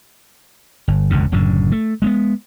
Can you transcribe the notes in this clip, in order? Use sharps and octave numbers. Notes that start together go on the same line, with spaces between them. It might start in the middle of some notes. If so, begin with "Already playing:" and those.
G1
E1 C#2 G2 C#3
F#1 F#2 A2 D3
A3
G#3 A#3 B3